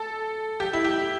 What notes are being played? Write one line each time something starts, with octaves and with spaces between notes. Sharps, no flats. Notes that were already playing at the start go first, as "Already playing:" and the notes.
Already playing: A4
G4
E4
G4